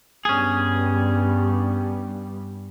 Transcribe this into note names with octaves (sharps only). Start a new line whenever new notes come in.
G2 G3 B3 C#4 G#4